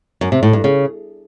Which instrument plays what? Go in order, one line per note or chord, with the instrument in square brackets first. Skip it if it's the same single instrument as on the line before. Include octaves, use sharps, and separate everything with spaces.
[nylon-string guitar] F#2
C3
A2
G2
C#3